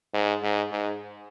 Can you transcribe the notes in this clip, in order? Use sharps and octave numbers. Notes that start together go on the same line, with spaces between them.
G#2
G#2
G#2